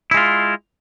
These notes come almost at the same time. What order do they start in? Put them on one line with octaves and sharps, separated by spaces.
E4 G#3 F4